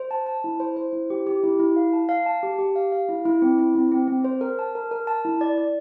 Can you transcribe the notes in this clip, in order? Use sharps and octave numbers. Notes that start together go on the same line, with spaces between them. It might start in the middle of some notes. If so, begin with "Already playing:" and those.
Already playing: C5
A5
A5
E4
C5
C5
E4
G4
G4
E4
E4
F5
A5
F5
A5
G4
G4
F5
F5
E4
E4
C4
E4
C4
C4
C4
C5
A#4
A5
A#4
A#4
A5
E4
D5
D5